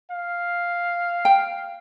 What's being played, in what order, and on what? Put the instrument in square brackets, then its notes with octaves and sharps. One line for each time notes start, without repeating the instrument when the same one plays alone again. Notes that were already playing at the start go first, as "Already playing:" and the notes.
[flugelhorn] F5
[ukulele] G5